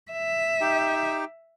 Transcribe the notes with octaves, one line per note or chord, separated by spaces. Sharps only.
E5
D#4 G4 G5